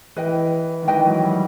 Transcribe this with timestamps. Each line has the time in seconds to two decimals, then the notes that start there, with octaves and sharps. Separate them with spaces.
0.16 E3 B4 D#5 G5
0.83 D#3
0.88 E3 B4 D#5 G5
1.06 F#3
1.23 G3